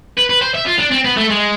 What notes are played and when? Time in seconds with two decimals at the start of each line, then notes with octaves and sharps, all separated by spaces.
0.17 B4
0.29 B4
0.42 C5
0.55 E5
0.67 F4
0.79 D4
0.92 C4
1.05 B3
1.17 A3
1.30 G#3